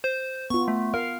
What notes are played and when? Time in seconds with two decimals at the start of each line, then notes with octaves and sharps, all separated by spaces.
0.04 C5
0.50 B3 F4 C#6
0.68 A3
0.94 A#4 F5